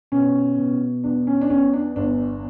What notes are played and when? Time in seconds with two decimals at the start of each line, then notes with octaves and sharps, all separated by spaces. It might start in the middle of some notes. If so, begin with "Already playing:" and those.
0.12 B2 C#4
0.58 B2
1.04 E2 D4
1.27 C#4
1.41 D4
1.50 E2 C#4
1.73 D4
1.96 G1 D4